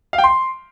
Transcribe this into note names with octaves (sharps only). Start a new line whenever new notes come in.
F5
G5
C6